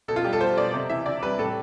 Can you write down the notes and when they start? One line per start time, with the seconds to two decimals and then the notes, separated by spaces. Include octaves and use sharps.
0.08 B2 A4
0.16 F4
0.24 G3 G4
0.33 A4
0.41 G3 C5
0.57 B2 D5
0.73 C3
0.90 E3 E5
1.06 C3 D5
1.23 G3 B4
1.39 A2 A4